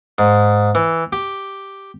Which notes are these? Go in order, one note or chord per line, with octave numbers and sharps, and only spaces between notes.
G#2
E3
G4